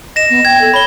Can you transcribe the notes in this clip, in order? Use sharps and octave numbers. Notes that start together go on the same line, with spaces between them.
D#5 A#6 E7
B3
G5 G#6
A4
C#5 B5 G7